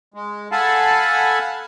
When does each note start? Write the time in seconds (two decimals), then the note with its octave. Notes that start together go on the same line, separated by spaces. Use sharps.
0.14 G#3
0.52 A4 F5 F#5 G#5 A5 B5